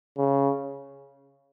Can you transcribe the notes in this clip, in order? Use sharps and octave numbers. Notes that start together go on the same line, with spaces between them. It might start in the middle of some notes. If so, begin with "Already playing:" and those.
C#3